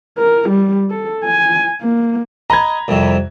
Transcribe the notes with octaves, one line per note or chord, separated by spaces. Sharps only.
A#4
G3
A4
G#5
A#3
D#5 A#5 B5 G#6
C2 F2 C3